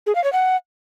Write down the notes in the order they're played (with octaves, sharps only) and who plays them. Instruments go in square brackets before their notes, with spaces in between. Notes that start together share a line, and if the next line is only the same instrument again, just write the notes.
[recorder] G#4
F5
C#5
F#5